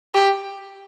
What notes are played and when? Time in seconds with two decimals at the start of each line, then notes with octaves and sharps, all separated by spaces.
0.14 G4